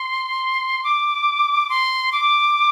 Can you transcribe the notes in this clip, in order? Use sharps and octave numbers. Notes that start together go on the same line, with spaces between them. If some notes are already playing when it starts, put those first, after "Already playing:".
Already playing: C6
D6
C6
D6